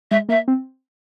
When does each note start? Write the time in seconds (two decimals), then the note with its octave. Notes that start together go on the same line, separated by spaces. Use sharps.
0.11 G#3 E5
0.29 A#3 E5
0.48 C4